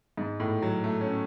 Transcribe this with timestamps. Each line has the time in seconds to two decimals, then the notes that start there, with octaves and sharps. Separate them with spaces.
0.17 G#2
0.40 A2
0.62 F#3
0.84 A3
1.01 C#4